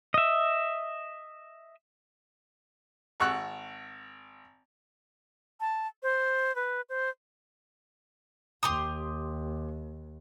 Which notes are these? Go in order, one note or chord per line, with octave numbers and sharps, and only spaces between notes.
D#5 E5
G#1 F#5 C#6 E6 F#6
A5
C5
B4
C5
D#2 G4 C6 D#6